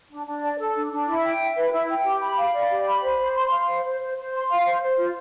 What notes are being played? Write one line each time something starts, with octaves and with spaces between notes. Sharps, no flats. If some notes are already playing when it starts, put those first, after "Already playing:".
D4
D4
D5
A4
D4
D4
E4
G5
E5
B4
E4
G5
G4
B5
F5
D5
G4
B5
C5
C5
C6
F5
C5
C5
C5
C5
C6
F5
C5
C5
F4